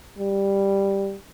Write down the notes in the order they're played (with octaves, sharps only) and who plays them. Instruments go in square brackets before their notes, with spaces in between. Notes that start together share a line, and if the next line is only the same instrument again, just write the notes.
[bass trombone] G3